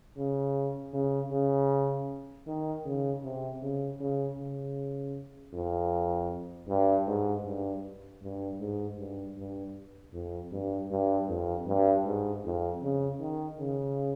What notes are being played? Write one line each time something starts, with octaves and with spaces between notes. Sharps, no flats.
C#3
C#3
C#3
D#3
C#3
C3
C#3
C#3
C#3
F2
G2
G#2
G2
G2
G#2
G2
G2
F2
G2
G2
F2
G2
G#2
F2
C#3
D#3
C#3